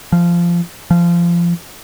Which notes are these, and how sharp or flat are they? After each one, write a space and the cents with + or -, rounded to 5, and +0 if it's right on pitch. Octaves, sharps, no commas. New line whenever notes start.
F3 -15
F3 -25